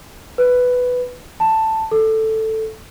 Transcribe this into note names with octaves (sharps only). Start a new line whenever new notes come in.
B4
A5
A4